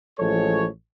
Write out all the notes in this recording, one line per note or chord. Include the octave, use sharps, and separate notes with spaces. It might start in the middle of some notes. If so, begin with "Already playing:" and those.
A1 F3 G#3 A4 C#5